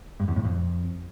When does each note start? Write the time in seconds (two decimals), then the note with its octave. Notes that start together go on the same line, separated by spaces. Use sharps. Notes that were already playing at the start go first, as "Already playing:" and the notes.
0.20 G2
0.28 E2
0.36 A2
0.45 F2